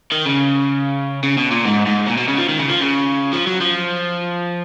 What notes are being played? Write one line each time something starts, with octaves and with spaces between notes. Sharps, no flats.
D#3
C#3
C#3
B2
A#2
G#2
G#2
A#2
B2
C#3
F3
D#3
C#3
F3
C#3
F3
F#3
F3